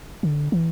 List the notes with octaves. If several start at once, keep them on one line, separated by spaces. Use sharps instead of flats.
D3
E3